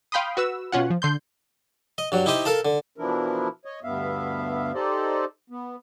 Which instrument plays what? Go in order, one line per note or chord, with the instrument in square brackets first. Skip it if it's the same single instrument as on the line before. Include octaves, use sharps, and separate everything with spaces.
[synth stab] F5 G5 B5 C6 D#6
F#4 B4 E6
B2 C#4 F4 F#5
F3
D3 C6 G6
[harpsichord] D#5
G2 F#3
D#4 E4 G4 C5 D#5
A4 A#4 F5 A5
D3
[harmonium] B2 E3 F3 D4 E4 A#4
C#5 D#5
D2 G2 B3 E5 F5
D#4 G4 A4 C5 D5 D#5
B3